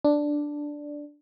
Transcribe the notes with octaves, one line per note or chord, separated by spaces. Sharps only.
D4